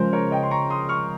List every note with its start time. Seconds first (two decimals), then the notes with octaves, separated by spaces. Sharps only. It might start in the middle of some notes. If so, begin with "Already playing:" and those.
Already playing: C#3 F3 G#3 A#4 C5
0.13 A#4 C#5
0.31 D#5 G5
0.43 C6
0.51 A#5 C#6
0.70 C6 D#6
0.89 C#6 F6